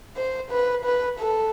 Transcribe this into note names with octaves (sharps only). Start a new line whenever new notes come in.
C5
B4
B4
A4